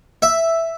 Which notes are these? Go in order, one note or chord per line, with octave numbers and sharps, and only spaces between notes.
E5